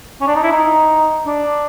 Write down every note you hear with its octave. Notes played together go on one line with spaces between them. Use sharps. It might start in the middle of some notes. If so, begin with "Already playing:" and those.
C#4
D4
D#4
E4
D#4
D4